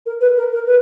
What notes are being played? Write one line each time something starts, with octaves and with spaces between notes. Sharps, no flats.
A#4
B4
A#4
A#4
B4